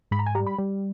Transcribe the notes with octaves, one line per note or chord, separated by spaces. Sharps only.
G#2 B5
A#5
G#5
G3 A#5
B5
G3